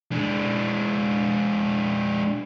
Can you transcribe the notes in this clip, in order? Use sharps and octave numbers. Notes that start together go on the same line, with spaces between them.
G#3 D4